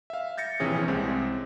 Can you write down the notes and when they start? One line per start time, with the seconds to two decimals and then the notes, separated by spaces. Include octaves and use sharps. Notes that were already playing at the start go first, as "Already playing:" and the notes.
0.10 E5 F5
0.37 G6 A6 A#6 C#7
0.60 A#1 C3 E3 C#4 G#4
0.88 C2 G#3 C4